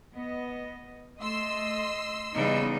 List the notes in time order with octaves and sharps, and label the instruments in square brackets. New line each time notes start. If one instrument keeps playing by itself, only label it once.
[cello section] B3 D#5
[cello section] A3 [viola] D#5 [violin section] C6 E6
[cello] C#3 G3 [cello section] E3 B3 D#4 [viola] D#5